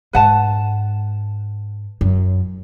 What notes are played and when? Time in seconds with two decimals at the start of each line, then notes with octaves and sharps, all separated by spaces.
0.13 G#2 B4 F#5 A5
2.01 F#2